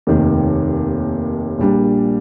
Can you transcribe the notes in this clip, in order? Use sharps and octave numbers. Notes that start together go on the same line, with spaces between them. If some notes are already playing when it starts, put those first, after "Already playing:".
F1 D#2 D#3
A#1 A#2 G3 D4